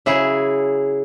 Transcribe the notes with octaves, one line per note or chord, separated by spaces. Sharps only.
C#3 F#3 E4 G#4